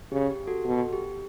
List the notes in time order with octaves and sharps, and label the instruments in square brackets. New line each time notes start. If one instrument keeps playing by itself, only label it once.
[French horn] C#3 [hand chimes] G4
[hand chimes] G4
F#4 A4
[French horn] B2 [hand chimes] F#4 A4
[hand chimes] G4